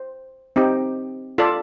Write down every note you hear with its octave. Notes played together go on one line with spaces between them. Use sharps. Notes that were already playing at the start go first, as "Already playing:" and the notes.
Already playing: C5
C4 D#4 G4
F4 A4 D5